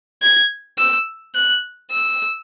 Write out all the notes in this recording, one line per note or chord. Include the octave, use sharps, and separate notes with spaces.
G#6
E6
F#6
E6